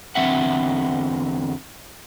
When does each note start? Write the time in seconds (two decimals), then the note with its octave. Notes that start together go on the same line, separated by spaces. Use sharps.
0.15 E2 D3 D#3 C4 E5 F#5